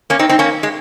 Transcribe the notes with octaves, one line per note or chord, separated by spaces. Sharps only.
A#3 C#4
C4 D#4
C4 D#4
A#3 C#4
G#3